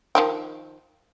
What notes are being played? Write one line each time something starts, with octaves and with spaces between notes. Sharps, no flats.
D#3 F3 G5